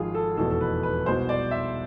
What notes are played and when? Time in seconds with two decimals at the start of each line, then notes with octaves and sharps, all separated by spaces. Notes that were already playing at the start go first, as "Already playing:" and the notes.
Already playing: G#1 G#2 F3 G#3 F4 G#4
0.14 A4
0.37 F1 E2 B2 G#3 A4
0.51 A4
0.61 B4
0.83 B4
1.06 C2 B2 G#3 C5
1.29 D5
1.51 E5